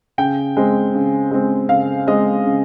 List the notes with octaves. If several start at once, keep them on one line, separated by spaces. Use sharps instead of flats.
C#3 G5
G#3 C4
C#3
G#3 C4
C#3 F5
G#3 C4 D#5
C#3